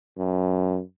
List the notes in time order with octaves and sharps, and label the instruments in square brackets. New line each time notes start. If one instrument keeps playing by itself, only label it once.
[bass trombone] F#2